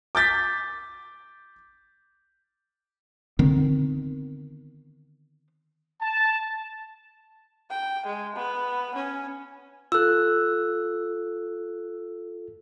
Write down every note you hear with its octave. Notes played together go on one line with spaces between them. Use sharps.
D6 G6 A6 B6
D3 D#3 B3 C4
A5
G5
G#3
B3
C#4
F4 A4 E6 F#6